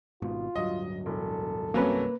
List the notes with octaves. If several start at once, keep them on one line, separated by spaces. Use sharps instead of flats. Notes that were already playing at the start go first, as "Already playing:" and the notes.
G#1 G#2 B2 F4
D1 G2 F#3 D#5
E1 A4
C2 G2 C3 F#3 A#3 C#4 B4